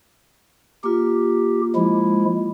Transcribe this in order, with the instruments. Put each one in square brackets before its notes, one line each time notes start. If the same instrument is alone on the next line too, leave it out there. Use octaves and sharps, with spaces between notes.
[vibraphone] A#3 F4 [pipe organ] G4
[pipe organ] F3 G#3 E4